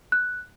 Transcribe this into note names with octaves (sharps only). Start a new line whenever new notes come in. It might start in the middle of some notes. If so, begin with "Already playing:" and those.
F#6